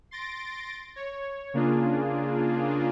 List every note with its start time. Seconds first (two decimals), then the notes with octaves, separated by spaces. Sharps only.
0.11 C6 A6 A#6 D7
0.96 C#5
1.54 C#3 A#3 D4 F4 G#4